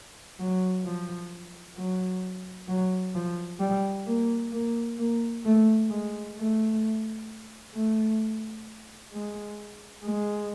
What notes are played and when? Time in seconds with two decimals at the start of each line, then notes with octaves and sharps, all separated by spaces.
0.39 F#3
0.84 F3
1.77 F#3
2.68 F#3
3.15 F3
3.60 G3
4.07 A#3
4.52 A#3
4.98 A#3
5.45 A3
5.90 G#3
6.36 A3
7.74 A3
9.13 G#3
10.04 G#3